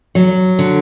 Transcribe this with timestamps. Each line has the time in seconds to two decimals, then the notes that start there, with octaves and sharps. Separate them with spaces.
0.15 F#3
0.59 D3